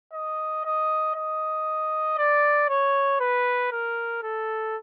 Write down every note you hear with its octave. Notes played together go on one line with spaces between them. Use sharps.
D#5
D#5
D#5
D5
C#5
B4
A#4
A4